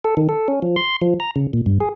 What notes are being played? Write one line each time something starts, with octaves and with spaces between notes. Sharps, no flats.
A4
D#3
A4
C#4
F3
C6
F3
A#5
C#3
A#2
G2
G#4